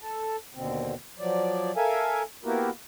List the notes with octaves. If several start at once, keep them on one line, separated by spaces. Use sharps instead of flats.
A4 A5
D#2 B2 D3 C4
F3 F#3 D5
A4 A#4 E5 F5 G#5
A#3 B3 E4 F#4 G4 A#4